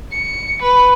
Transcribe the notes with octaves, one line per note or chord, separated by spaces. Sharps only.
C#7
B4